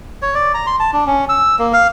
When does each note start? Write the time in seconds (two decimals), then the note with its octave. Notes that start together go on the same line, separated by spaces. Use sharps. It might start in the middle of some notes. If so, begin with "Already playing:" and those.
0.22 C#5
0.35 D5
0.54 A#5
0.67 C6
0.80 A5
0.93 D4
1.07 C#4
1.29 E6
1.59 A#3
1.73 F5